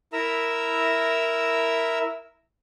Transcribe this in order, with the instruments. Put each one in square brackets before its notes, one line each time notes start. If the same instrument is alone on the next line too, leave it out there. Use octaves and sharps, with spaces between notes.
[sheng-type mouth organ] E4 A#4 E5 A#5 E6